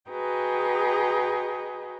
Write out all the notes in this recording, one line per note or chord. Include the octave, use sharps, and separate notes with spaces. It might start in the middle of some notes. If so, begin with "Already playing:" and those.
F#4 G#4 B4 D#5 G5 A#5